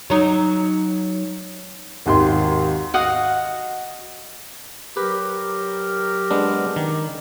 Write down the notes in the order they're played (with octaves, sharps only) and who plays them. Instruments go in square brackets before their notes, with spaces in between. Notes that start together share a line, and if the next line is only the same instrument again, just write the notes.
[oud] F#3 D#4
[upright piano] G#1 D#2 C6
[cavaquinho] F#4 D#5 F5 F#5
[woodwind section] F#3 A#4 [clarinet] G4 [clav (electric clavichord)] B4
[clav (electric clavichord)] G#3 B3 D4
D#3